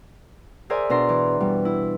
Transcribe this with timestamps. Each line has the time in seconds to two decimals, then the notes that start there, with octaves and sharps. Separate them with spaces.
0.70 G#4 A#4 C5 D5 E5 G#5
0.90 B2 D4 A#5 C6
1.09 E3
1.40 B2 G3
1.65 E4